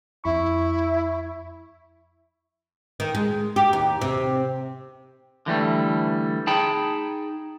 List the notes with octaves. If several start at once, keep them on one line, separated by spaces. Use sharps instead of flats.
F2 E4 B5 C#6
D#3
G#3
G4
D#2
C3
D3 E3 G3 A3
D#4 G#4 G5 A5 B5